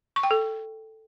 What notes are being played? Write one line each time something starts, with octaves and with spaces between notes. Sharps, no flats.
C#6
G5
A4